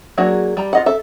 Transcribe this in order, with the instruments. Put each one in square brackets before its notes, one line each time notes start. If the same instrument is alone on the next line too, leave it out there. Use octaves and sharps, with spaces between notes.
[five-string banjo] F#3 A#3 D4 F#4 G#4
G3 A#5
F4 D#5 F#5
A4 E5